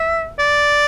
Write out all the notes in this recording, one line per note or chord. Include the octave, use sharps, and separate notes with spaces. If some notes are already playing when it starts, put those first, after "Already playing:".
Already playing: E5
D5